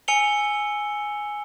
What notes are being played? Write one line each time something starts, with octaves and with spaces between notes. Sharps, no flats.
G#5 E6 C#7 F7 G7